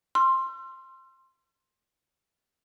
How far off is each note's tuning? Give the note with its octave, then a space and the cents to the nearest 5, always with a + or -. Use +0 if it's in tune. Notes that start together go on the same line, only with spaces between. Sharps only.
C6 +10 E6 +45